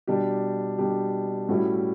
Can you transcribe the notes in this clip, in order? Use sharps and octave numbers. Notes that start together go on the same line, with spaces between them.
B2 G3 D4 G4
B2 G3 D4 G4
A2 G3 C#4 E4 F#4